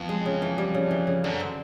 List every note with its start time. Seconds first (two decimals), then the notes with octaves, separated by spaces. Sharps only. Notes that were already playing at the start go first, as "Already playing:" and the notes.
Already playing: F2 E3 B3
0.09 G#3
0.26 C#3
0.42 E3
0.58 G3
0.74 C#3
0.91 E3
1.07 C#3
1.24 F#2 D3
1.40 C4